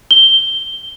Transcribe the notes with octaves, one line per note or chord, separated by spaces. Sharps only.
G7